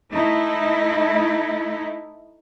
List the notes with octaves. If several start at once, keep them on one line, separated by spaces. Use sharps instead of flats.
A3 D#4 E4